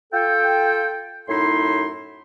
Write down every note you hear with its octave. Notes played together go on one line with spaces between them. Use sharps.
F4 A4 G5
F#2 A2 D#4 E4 C6